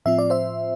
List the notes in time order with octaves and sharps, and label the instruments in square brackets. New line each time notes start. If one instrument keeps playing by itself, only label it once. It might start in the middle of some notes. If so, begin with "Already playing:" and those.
[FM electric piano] A2 F3 C4 F4 E5
D5
C5 E5